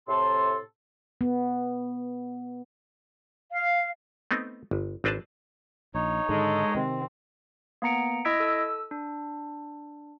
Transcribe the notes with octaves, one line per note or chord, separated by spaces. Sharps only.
A2 C3 A4 C6
B3
F5
A3 B3 C4 D#4
G1
G#1 C4 D4 B4 C5 A5
A#1 D#4 C#5
G#2 D3 D#3 G#3 A4 D#5
C3 D#3 C4
A#3 B3 A#5 C#7 D7
E4 D#5 E6 G#6 B6 D7
A4 E6
D4